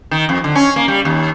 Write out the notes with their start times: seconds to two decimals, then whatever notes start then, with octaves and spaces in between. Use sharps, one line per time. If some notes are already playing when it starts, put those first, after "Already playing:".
0.11 D#3
0.29 F2
0.44 D3
0.55 C#4
0.76 A#3
0.88 G3
1.05 D#2